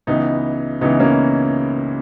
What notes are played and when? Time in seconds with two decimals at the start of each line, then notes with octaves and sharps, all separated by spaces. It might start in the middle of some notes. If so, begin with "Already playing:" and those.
0.07 C#2 C#3 E3 B3 D#4
0.81 C#2 C#3 E3 B3 D#4
1.00 A#3 C#4